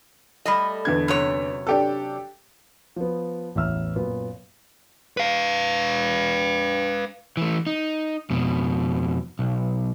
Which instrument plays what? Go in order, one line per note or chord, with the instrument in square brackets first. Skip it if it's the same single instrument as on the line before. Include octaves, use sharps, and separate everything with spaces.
[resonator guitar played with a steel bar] G3 A3 D#5
[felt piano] E2 D3 G#6
[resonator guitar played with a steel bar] F#2 C3 C#5
[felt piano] D4 G4 A4
[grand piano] F3 B3
A1 E2 E5 E6 F6
F#2 A#2 A#3 B3
[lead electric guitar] B4 F5
[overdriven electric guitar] E3 A3
D#4
F2 B2
B1